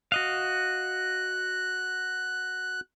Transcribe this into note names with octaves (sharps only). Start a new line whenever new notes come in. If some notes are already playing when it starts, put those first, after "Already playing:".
F#4 D#5 F5 F#6